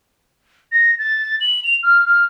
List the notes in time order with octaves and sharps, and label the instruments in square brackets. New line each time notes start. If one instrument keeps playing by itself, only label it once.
[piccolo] A#6
A6
F#7
F7
F6
F6